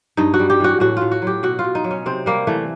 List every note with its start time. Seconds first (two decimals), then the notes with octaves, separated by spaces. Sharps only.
0.17 G2 D#4
0.34 F#4
0.39 G3
0.50 G4
0.60 E3 F#4
0.80 A2 F#4
0.97 A2 F4
1.12 F#4
1.22 F#3 G4
1.43 B2 F#4
1.59 F4
1.64 B2
1.75 D#4
1.84 F#3
1.91 C#4
2.06 C3 C4
2.26 G3 A#3
2.47 E3 A3